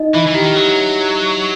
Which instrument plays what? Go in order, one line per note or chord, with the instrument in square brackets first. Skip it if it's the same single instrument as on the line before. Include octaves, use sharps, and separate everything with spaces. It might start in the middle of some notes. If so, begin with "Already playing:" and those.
Already playing: [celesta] D#4 D#5
[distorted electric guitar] E3 [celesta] E4 E5
[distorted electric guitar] E3
[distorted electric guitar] D#3 [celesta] G4
[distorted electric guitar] F#3 [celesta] G4